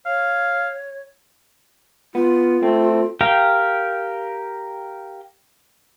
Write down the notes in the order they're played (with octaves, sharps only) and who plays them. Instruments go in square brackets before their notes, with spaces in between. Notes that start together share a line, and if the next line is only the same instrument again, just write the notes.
[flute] C#5 [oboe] F5
[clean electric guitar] B3 [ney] F4
[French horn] A3 [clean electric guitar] C4
[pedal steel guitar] G4 A#4 F5 G5